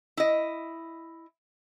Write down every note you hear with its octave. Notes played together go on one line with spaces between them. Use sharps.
E4 D#5